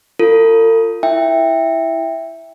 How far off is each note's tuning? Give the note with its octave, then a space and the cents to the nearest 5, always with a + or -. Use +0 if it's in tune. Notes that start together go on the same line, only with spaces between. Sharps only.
F4 +0 A4 +45
E4 +0 E5 +0 G5 +15